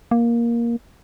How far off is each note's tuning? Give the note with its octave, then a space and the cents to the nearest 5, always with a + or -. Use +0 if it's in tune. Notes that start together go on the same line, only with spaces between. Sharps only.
A#3 +10